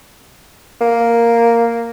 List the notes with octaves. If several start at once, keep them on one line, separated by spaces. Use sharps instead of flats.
A#3